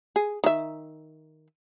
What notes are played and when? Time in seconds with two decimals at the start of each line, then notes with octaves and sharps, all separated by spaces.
0.16 G#4
0.44 D#3 E5